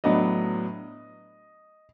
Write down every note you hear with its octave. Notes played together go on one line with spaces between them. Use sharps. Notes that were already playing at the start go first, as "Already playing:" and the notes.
A2 F#3 B3 D4 D#5